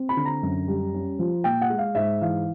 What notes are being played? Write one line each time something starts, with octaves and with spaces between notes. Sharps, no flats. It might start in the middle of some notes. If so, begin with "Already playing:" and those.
Already playing: C4
B5
D3
A#5
F#2
G3
C#4
F3
A#2 G5
F#5
G#3
F5
G#2 E5
E3 F5